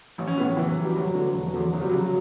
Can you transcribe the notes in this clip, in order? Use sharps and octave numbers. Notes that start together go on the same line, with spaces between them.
A1
C#4
A2 E3 B3
F#1 E3
F#3
F#2 E3
G3
D2 F#3
D3
E1 F#3
E2 D3
F#1 F#3
G3
F#2 C#3 F#3